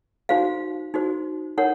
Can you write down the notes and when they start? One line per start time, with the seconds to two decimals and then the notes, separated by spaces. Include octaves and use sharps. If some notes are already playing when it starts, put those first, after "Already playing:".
0.29 D#4 F#4 C5 F5
0.94 D#4 F#4 C5
1.58 D#4 A#4 C#5 F#5